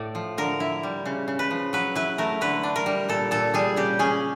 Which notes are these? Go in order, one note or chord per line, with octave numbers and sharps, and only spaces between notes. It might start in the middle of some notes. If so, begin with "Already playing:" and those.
Already playing: A2 D5
F3
D3 A#4
E4
G3
C#3
C#3
B4
F3
F#3 B4
E4 B4
A3 A#4
D3 B4
D4
A#4
G3
A#2 A4
A#2 A4
G3 G#4
C#3 G4
C#4 G#4